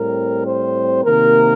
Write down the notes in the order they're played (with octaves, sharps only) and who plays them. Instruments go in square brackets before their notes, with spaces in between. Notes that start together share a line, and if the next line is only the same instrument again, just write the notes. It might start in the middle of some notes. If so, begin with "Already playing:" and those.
Already playing: [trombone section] A2 G3 C4 A#4
C5
C3 D#3 A#3 A#4